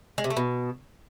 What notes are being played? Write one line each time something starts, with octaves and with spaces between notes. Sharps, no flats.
G#3
C3
A3
B2